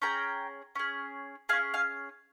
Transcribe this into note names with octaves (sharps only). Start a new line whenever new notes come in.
C#4 G#4 G5 A#5
C#4 G#4
C#4 G#4 F5 G#5
F5 G#5